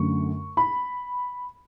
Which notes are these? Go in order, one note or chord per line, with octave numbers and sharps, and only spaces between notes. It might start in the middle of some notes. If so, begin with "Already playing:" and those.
Already playing: F#2 D3 A3 C#6
B5